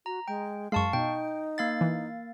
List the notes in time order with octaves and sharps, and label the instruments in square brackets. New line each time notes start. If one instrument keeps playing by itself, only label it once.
[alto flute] F#4 [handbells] A#5
[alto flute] G#3 [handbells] G5
[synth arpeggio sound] F#2 G#3 [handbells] F5 A5 C#6 [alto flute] C6
[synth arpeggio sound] B2 [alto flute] D#4 [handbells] G5
[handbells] A#3 F5 A6
[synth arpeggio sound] E3